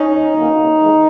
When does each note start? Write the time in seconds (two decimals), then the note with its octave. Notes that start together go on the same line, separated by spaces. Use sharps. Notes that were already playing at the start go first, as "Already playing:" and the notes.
Already playing: C#4 D#4
0.11 D#2
0.34 D3 F#3 A#3 C#4
0.56 C3
0.79 E3 G#3